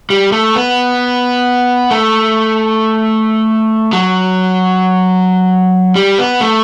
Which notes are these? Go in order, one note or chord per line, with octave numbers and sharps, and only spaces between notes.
G3
A3
B3
A3
F#3
G3
B3
A3